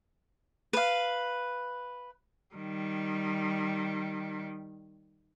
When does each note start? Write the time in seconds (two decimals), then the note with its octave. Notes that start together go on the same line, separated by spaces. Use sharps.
0.73 B4 F5
2.55 D#3 G3